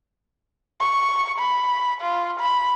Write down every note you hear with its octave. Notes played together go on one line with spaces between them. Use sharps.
C#6
B5
F4
B5